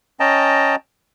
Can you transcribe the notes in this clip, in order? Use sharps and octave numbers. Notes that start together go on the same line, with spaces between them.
C#4 D#5 G5 A5 A#5